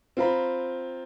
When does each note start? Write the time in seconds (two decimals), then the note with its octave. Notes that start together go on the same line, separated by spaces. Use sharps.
0.17 C4 F4 A#5 B5